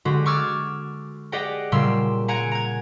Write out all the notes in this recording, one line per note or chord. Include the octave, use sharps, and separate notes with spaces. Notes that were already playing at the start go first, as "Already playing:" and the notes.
D3 G#3 F#4 G4
C#6 D6 E6 F6 G#6 A6
G4 G#4 D5 D#5 F#5 G5
A#2 C#3 G3 C6 E6
F#5 G#5 A#5 G#6 C#7 D7
A#5 G#6